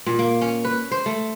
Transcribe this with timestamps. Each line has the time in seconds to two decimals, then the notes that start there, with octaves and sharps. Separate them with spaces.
0.06 A#2
0.19 A#3
0.41 C#4
0.64 B4
0.91 C5
1.06 A3